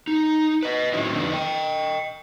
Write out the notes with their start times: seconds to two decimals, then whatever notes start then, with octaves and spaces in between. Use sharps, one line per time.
0.07 D#4
0.63 B4 D#5
0.93 A2 D#3 F#3 C4 C#4 E4
1.14 F2 D3 D#3 F3 B3 D4
1.30 D#5 G5